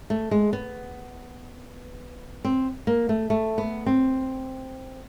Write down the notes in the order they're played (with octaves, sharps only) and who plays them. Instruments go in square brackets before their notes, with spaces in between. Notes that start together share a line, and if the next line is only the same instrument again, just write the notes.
[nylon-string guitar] A3
G#3
B3
C4
A#3
A3
A3
B3
C4